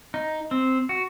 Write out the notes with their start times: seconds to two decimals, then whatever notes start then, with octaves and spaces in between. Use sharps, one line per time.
0.14 D#4
0.51 C4
0.89 F#4